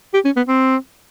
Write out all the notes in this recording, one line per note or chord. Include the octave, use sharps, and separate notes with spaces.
G4
C#4
B3
C4